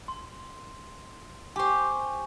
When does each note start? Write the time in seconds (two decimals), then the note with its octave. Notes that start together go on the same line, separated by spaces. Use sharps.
0.08 C6
1.56 G4 C5 G#5 C#6